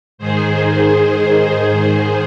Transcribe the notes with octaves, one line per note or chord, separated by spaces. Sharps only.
G#2 D#3 G#4 C5